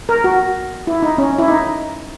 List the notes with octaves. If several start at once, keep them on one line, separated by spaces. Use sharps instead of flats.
A#4
F#4
E4
D#4
C#4
E4
D#4